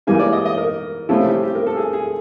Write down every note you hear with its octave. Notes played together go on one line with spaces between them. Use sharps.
G#2 E3 G3 A#3 D#4 G#5
D5
D#5
D#5
A#4
C3 F3 A3 C#4 E4 F4
G4
G4
A#4
A4
G#4
G#4